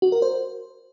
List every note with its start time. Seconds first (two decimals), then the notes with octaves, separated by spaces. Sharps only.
0.02 F#4
0.12 A#4
0.22 C5